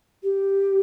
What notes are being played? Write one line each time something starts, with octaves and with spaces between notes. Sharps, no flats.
G4